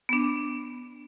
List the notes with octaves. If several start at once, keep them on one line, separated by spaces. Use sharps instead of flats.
B3 D4